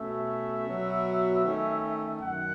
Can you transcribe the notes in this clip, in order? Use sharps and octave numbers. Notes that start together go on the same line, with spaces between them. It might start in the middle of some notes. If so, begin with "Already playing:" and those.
Already playing: B2 A3 C#4 E5
B2 F#3 B3
D#3 A3 C#4
F#2 D#3 F#5